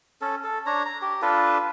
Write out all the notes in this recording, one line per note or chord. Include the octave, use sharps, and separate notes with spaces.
C#4 A4
A4
D4 C#5 A#5
A#5
G4
D4 F4 A4 B4